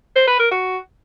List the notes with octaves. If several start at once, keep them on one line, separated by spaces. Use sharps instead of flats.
C5
B4
A#4
F#4